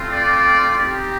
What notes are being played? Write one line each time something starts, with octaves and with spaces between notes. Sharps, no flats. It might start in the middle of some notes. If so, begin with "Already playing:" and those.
Already playing: A3 C4 F4
D5
C4 D#4 G4